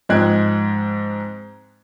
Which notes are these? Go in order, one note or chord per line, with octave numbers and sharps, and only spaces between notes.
G#2 F3 G#3 C4 F#6 G#6